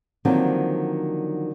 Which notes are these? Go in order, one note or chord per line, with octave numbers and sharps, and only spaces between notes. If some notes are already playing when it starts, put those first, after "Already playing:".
D3 D#3 F3 F#3 A#3 C4